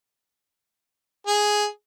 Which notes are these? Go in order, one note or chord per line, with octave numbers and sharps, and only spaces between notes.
G#4